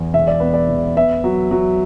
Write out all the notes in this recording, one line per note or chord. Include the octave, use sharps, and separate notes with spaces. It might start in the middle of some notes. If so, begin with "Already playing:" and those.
Already playing: E2
E1 E5
D5
B3 B4
D5
E1
B3 E5
F#3
F#3